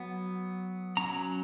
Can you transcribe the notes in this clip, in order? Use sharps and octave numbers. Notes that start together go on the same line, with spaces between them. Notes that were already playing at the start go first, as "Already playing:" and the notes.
Already playing: F#3 B3
F#3 C#4 A#5